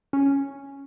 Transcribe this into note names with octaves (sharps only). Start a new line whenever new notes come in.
C#4